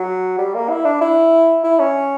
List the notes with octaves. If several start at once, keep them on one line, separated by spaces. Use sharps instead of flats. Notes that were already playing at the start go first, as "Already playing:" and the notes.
Already playing: F#3
G3
A#3
E4
D4
E4
E4
C#4